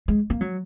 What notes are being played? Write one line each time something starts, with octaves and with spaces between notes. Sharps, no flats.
G#3
A#3
F#3